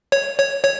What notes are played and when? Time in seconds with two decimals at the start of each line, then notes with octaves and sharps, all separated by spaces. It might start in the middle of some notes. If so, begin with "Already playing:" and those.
0.12 C#5
0.39 C#5
0.64 C#5